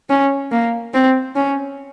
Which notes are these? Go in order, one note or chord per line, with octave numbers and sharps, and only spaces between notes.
C#4
A#3
C4
C#4